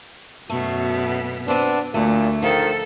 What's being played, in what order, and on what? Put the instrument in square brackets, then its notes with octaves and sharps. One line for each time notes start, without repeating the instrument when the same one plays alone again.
[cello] F#2 B2 [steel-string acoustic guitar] A3
[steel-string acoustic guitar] B3 C4 [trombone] D4
[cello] D2 [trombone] A#2 [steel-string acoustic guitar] A3
[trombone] D#3 [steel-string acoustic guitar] F3 [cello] A4